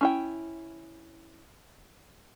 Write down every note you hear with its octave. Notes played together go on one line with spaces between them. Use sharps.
C#4 E4 G5